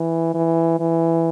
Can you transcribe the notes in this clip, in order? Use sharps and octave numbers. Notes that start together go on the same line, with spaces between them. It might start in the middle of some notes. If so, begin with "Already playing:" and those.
Already playing: E3
E3
E3